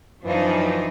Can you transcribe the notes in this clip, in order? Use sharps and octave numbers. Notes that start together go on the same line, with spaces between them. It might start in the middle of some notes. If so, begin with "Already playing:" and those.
F#2 E3 F3 D4 D#4